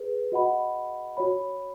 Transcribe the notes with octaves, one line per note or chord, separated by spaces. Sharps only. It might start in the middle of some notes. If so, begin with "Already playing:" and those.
Already playing: G#4 B4
F#4 D#5 F#5 B5
F#4 C#5 B5